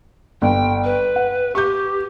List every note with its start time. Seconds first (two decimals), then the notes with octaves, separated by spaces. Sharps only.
0.42 G1 G5
0.84 B4
1.16 F#5
1.55 G4 C#6 G6